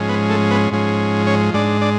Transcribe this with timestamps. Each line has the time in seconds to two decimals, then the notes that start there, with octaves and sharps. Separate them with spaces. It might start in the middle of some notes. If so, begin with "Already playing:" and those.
Already playing: G#2 F3 G#3 C#4
0.09 B3 B4
0.30 A3 A4
0.51 B3 B4
0.72 G#2 F3 G#3 C#4
1.27 C#4 C#5
1.54 G#2 G#3 D4 D5
1.81 D4 D5